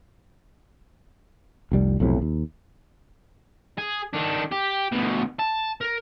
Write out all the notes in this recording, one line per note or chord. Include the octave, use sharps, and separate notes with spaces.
F1 C2 G3
B1 F2 A2 C3
D#2
G#4
D#3 D4
G4
D2 B2
A5
A#4